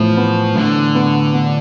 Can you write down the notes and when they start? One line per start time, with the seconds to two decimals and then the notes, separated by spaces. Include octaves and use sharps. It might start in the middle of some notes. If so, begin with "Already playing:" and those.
Already playing: A2 E3 F3 B3
0.17 B3
0.56 A2 D3
0.95 B3
1.34 B3